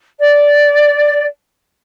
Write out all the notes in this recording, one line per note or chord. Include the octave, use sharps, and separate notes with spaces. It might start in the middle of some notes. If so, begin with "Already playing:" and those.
D5